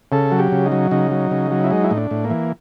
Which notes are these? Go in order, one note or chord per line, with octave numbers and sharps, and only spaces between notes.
C#3 A4
F#3
G4
C#3
D#4
F#3
C#3 D#4
F#3
C#3
F#3
E4
G#3 D#4
E4
A2 D#4
D4
A2
A#3
E3